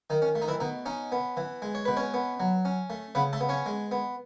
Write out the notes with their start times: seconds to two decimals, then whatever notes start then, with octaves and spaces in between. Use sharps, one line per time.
0.10 D#3 D#4
0.22 C#4
0.35 A3
0.42 D#4
0.48 E3 E4
0.60 B2 D#4
0.86 C#4 D#4
1.12 B3
1.37 E3
1.62 G#3
1.75 C#5
1.85 B2 B4
1.97 C#4 C#5
2.14 B3
2.40 F#3
2.65 C#4
2.90 A3
3.15 C#3 B3 B4
3.33 A3 A4
3.41 B3
3.49 C#4 C#5
3.66 G#3
3.91 B3